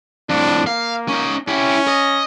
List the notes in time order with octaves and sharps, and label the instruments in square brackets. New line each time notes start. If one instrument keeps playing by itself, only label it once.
[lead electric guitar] F2 A2 [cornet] D4
[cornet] A#3 [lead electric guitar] F5
[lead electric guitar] C#4 D#4
[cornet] C#4 [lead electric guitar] E4 G4
[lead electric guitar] D#5